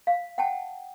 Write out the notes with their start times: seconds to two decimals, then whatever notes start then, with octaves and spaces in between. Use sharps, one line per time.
0.07 F5
0.38 F#5 G5 A5